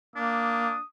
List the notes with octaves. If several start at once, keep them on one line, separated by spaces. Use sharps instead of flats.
A#3 D4 D#6